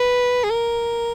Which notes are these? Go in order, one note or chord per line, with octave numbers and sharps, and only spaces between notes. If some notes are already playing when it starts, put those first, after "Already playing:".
Already playing: B4
G#4
A#4